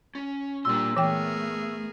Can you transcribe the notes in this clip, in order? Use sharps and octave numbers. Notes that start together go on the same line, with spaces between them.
C#4
A#2 G3 A#3 D4 C6 E6
E3 A3 B3 G#4 A#4 G5